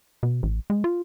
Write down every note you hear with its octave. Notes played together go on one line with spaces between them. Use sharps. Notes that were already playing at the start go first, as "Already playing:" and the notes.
B2
A1
G#3
F4